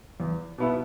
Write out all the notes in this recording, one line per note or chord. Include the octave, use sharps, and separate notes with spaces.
E2
B2 B3 E4